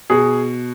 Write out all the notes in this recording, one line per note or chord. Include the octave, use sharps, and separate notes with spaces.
B2 G#4